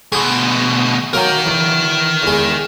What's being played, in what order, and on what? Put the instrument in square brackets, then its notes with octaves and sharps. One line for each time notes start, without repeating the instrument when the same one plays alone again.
[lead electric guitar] D2 B2 [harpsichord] G#4
[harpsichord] F#3 A#3 [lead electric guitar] A#4 G5
[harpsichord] E2
E2 G#3